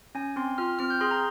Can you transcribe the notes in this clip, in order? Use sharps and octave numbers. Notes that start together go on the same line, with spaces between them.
C#4 G#5
C4 C6
F4 F6
C4 F6
G6
G#4 C6
A#5